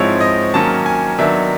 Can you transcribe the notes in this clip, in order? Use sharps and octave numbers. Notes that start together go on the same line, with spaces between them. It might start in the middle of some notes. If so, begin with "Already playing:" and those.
Already playing: G#2 F3 G#3 C4 E4 C#5
D#5
D#3 F#3 A#3 C#4 A5
G#5
D#3 F#3 B3 D4 E5